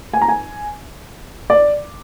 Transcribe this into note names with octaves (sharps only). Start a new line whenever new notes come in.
G#5
A#5
G#5
D5